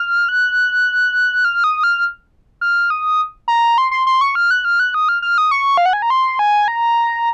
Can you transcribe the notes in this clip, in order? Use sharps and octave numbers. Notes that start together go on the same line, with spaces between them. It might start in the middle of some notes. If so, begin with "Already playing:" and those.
Already playing: F6
F#6
F6
D#6
F6
F6
D#6
A#5
C6
C6
C6
C#6
F6
F#6
F6
F#6
D#6
F6
F6
D#6
C#6
F5
F#5
G#5
A#5
C6
G#5
A#5